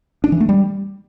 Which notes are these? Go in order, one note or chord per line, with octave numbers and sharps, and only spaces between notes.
D4
E3
A3
G3